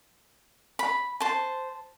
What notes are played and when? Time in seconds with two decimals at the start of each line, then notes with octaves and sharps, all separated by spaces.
0.79 B5
1.20 C5 A5